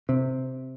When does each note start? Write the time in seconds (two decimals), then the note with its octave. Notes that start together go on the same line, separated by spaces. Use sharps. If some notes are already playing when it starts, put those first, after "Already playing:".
0.09 C3